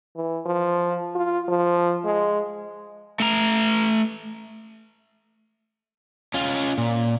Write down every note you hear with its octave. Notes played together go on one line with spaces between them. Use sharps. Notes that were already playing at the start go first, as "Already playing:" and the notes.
E3
F3
F4
F3
G#3
A3 A#5
C#4 F4
A#2